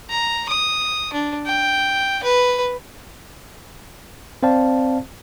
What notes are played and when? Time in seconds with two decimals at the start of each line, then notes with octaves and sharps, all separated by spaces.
0.10 A#5
0.49 D#6
1.13 D4
1.46 G5
2.24 B4
4.43 C4 C5 D5 F5 A5